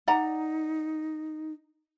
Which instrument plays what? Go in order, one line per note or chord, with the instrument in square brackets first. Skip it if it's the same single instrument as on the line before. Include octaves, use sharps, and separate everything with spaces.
[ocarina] D#4 [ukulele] D5 F#5 A#5